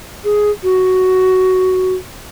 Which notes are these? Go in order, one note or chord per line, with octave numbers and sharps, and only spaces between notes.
G#4
F#4